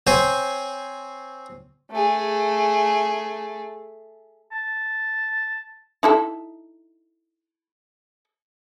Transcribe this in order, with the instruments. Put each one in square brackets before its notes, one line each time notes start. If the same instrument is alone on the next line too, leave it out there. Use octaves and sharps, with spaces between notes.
[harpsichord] C4 C5 C#5 G#5
[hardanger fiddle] A3 G#4
[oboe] A5
[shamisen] D#4 E4 A4